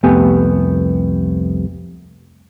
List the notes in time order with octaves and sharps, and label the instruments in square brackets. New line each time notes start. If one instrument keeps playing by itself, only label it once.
[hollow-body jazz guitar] C2 F2 A3 B3 G4 G#5